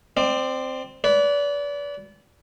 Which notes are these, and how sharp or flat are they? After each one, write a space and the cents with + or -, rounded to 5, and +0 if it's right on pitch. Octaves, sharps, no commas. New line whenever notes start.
C4 -5 D5 +25
B4 +0 D5 -30